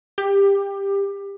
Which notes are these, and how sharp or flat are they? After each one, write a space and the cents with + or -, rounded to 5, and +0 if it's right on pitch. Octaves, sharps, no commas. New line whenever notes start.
G4 +20